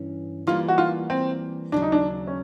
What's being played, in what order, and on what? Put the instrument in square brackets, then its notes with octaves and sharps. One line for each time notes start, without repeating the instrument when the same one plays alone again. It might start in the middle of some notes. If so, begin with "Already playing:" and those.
Already playing: [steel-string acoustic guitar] G2 E3 C#4
[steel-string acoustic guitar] E3 G3 A#3 [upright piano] F4
[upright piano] F#4
F4
C4
[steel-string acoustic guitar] D#2 C#3 F#3 [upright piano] D4
[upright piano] D#4
D4
C#4